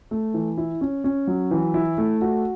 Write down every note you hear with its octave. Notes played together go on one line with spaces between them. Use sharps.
A3
E3
E4
C#4
C#4
F#3
E3
E4
A3
F#4